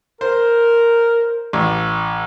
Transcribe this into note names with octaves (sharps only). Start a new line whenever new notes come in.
A#4 C5
A1